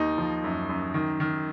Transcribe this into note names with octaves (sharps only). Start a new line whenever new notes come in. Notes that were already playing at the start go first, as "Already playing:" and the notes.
Already playing: D#2 D#4
F3
F#2
F#2
D#3
D#3